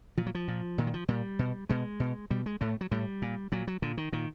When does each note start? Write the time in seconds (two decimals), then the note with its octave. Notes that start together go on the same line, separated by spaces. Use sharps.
0.18 A#2 F3
0.26 F#3
0.35 F3
0.48 A#2
0.78 A#2 D#3
0.87 F#3
0.94 F3
1.08 A#2 G3
1.39 B2
1.69 B2 G#3
2.00 B2
2.30 B2 G3
2.46 G#3
2.61 A2 A3
2.81 F#3
2.91 A2 G3
3.22 A#2
3.52 A#2 F#3
3.67 F#3
3.82 A#2 D3
3.97 D#3
4.12 A#2 D#3